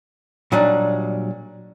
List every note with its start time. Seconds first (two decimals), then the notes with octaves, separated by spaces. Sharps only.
0.52 A#2 F#3 G3 D4 D#4